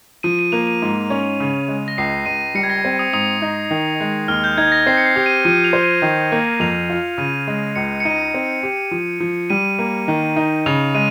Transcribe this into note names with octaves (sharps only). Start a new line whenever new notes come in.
F3 D#7
D#7
A#3 F7
D#7
G#2
C#4
C#3
G#3
A#6
C#2 C7
C#2 D#7
G3 C#7
G#6
A#6
C4
D#6
G#2 D#6
D#4
D#3
G#3
D#2 F6
G6
D#4 G#6
A#6
C4 C7
C#7
C7
G4
D#7
F3 D#7
F7
C5
D#7
D#3
A#3
F2 F7
F4
C#3 D#7
G#3
C#2 C#7
C#7
D#4 D#7
C4
G4
F3
F3
G3 D#7
A#3
D#3
D#4
C#3 F7
G#3 D#7